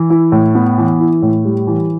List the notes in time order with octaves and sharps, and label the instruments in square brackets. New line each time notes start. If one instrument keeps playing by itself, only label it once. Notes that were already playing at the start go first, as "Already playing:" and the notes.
Already playing: [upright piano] E3
E4
A2
B3
E3
E4
A2
G3
E3